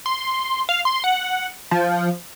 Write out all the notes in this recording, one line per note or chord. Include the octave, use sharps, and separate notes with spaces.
C6
F5
C6
F#5
F3